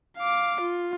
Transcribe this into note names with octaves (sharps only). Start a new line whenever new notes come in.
F5 D6
F4